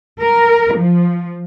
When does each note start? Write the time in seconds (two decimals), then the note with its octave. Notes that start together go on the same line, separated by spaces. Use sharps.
0.21 A#4
0.78 F3